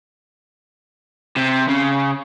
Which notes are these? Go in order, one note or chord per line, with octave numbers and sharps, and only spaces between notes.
C3
C#3